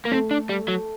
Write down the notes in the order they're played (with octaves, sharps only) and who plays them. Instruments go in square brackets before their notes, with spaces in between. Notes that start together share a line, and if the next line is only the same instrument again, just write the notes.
[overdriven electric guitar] A#3
[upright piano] A3 [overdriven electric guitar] C4
[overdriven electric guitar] D4
G3
F#3